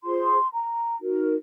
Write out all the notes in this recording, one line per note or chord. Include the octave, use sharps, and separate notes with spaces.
F4 G#4 C5 C6
A#5
D#4 F#4 A#4